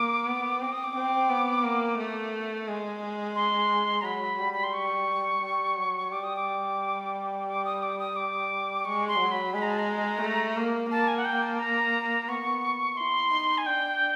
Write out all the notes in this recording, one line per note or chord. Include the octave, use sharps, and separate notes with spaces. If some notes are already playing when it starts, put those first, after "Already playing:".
Already playing: A#3 D6
B3
C4 D6
D#6
D6
C4
B3
A#3
A3
G#3
C6
A#5
F#3 B5
G3
B5
C6
C#6
G3
F#3
G3 D6
D#6
D6
D6
D#6
D6
D#6
D6
G#3 C#6
C6
F#3
B5
G#3 B5
A#5
A5
A#5
A3
A#3
A#3 A5
G#5
F#5
G5
A5
A#5
B3 C#6
E4 C6
D#4
G#5
D4 G5